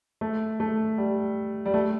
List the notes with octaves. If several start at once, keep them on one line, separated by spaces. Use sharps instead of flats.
A3
A3
G3
G3
A3